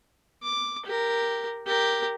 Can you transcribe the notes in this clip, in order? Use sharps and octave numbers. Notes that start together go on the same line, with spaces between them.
D6
G4 A#4
G4 A#4